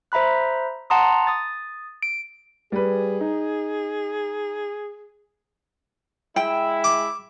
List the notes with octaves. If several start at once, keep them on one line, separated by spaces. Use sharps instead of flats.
C5 E5 A#5 B5 F#6
F#5 A5 A#5 C6 D#6
D#6 A6
D7
G3 G#4 B4
D#4
G#3 E4 G5
D6